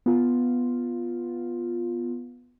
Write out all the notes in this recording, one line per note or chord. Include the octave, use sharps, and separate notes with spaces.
B3 F4